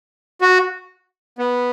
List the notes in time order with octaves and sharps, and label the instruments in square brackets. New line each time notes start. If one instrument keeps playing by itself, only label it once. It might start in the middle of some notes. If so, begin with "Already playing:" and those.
[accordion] F#4
B3